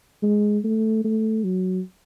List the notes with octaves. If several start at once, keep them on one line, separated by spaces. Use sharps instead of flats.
G#3
A3
A3
F#3